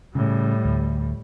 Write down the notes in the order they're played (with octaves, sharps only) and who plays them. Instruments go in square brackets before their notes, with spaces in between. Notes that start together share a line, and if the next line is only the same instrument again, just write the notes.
[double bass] A2 G3 [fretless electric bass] C#3
[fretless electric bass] D2